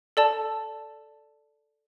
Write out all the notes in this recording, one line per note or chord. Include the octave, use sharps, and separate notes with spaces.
A4 D5 A5